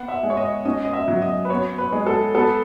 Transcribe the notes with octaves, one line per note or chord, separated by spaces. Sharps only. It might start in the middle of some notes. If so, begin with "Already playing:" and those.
Already playing: B3 F#5
E5
G#3
C#5
D#5
C#4 D#5
D#5
E5
F#3
D#5
B4
B3 C#5
B4
G#3
A4
B3 A4